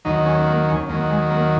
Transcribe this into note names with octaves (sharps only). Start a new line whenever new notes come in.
D#2 D#3 F#3 D#4
C#4
A#3
C#4
D#2 D#3 F#3 A#3
G#3
A#3